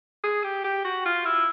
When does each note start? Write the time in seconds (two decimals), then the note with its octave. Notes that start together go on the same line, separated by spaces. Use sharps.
0.24 G#4
0.44 G4
0.64 G4
0.85 F#4
1.05 F4
1.25 E4